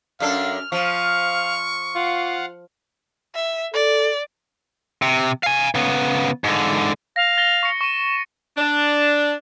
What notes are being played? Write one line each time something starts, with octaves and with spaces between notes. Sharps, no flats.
F#2 D4 A4 F5 F6
F3 F5 C#6 F6
F4 F5 F#5
E5
A4 D5
C3
F5 G#5
C#3 B3
G#2 D3
F5 A#6
A6 A#6 G7
C#6 A#6 C#7
C#6 D#7 E7
D4